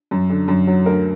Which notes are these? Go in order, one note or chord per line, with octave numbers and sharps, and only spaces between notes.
F#2
D3
F#2
F#3
D2 A#4